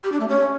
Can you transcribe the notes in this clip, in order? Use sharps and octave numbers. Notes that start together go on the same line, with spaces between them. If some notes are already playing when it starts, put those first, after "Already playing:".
G4
D4
A3
C#4